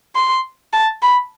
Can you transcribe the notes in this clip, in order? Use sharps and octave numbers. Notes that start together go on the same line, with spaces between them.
C6
A5
B5